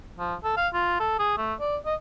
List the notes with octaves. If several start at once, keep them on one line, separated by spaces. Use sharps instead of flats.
F3
A4
F5
F4
A4
G#4
A3
D5
D#5